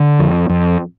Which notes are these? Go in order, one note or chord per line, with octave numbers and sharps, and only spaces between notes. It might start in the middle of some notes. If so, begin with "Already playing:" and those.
Already playing: D3
F2
F2